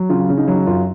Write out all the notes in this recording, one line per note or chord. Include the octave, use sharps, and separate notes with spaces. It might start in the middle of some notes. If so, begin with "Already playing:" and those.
Already playing: F#3
C#3 F4
C#3
D#4
F#3
F#2 F4